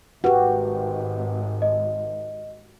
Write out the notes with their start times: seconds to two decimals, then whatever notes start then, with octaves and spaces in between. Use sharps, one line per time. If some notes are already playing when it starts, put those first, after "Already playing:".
0.24 G#1 F#4 G4 B4 F#5
1.62 D#5